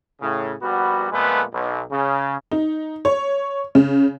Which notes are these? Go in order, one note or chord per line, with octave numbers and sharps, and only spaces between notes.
A2 C#3
A#1 G3 B3 F#4
F2 A#2 G#3 A3 B3 B4
B1
C#3
D#4
C#5
C#3